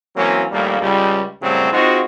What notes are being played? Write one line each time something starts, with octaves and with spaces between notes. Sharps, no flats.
E3 F#3 A#3 C4 C#4
A#1 D#2 G3 A3 A#3
C#2 G3
F#2 A2 C#3 F#3 G3 C4
G#3 C4 D#4 F4 F#4